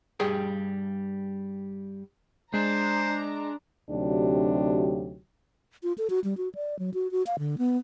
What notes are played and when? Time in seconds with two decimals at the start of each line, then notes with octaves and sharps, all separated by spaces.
0.20 G2 G3 G#4 G5
2.54 G#3 D4 C5 A#5
3.90 D2 C3 F#3 D4 D#4 G4
5.83 F4
5.98 A4
6.10 F#4
6.24 G3
6.37 F#4
6.55 D5
6.79 F#3
6.94 F#4
7.11 F#4
7.27 F5
7.39 D3
7.58 B3